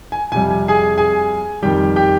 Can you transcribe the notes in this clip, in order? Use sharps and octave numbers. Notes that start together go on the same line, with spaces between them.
G#5
F2 C3 G3 G#5
G#5
G#4 G#5
G#4 G#5
F2 D#3 G3 G4 G5
G4 G5